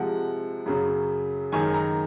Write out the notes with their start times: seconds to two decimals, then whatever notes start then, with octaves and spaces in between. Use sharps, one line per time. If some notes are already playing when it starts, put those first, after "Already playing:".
Already playing: C3 F3 G#3 F#5
0.66 F#2 C#3 F#3
1.52 F#2 D#3 G#3 G#5
1.74 A#5